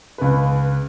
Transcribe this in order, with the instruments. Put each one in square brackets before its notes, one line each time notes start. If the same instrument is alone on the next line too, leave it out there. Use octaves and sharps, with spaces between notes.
[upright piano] C#2 B4